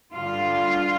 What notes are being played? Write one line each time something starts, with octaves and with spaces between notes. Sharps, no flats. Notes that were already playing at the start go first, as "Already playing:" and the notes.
G2 D3 G3 F4 F5